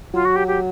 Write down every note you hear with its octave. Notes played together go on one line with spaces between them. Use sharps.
F#3 F4
F#4
G4
G4